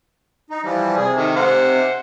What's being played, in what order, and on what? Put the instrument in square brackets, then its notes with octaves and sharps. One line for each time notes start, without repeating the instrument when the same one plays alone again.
[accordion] D#4
E3 F3 G3
[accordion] C3 [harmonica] G#4
[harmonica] D#3 A4
C5 F#5